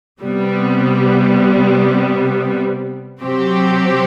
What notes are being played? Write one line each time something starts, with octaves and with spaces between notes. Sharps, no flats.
C3 G3 B3
C3 F#3 C4 G4